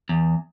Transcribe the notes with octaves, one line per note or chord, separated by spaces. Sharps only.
E2